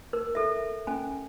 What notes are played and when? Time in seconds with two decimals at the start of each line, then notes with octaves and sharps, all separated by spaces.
0.13 A#4
0.35 A4 E5
0.87 C#4 G#5